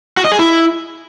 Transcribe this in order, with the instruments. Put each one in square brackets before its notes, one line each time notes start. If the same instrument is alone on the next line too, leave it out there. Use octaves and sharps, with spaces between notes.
[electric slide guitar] F#4
D#5
G#4
E4